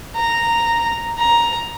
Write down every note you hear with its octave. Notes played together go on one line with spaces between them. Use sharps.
A#5
A#5